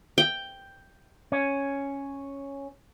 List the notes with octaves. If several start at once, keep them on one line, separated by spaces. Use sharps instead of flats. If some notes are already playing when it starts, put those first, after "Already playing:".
G5
C#4